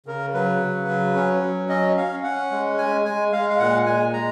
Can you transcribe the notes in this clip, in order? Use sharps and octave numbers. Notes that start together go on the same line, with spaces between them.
C#3 A#4
F#3 B4
C#3
F#3
C#4
F#3
C#4 D#5
C#4 F5
C#4 F#5
G#3
G#3 G#5
G#3 G#5
G#3 F5
F5
A#2 F#5
A#2 G#5
G#3 A#5